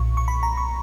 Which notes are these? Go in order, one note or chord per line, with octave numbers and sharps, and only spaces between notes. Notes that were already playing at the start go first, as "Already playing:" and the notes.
Already playing: B1 A#2 C#6
C#6
B5
A#5
C#6